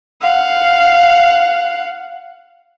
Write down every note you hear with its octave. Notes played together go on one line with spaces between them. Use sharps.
F5 F#5